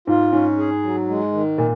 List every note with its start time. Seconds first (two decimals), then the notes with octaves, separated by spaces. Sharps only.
0.07 G#2 F4
0.32 G#2 C#4
0.58 G#4
0.83 F#3
1.08 G#3
1.32 D#3
1.58 A#2